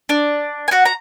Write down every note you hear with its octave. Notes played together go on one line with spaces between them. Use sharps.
D4 D5
G#5
F#4 F#5
A#5